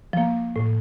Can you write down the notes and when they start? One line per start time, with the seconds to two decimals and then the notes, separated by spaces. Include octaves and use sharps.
0.13 F3 A#3
0.56 A2